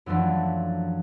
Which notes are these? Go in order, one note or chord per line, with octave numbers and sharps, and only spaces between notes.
F#2 E3 F3 A3 D4